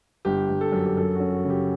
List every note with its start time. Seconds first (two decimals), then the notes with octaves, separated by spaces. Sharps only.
0.25 G1 G4
0.49 G1
0.61 A4
0.72 F#2
0.86 G4
0.97 F#2 A4
1.15 C#4 F#4
1.33 F#4
1.45 C#3
1.50 G4